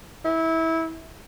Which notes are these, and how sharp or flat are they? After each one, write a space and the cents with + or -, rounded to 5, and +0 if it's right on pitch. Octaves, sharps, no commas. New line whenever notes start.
E4 -20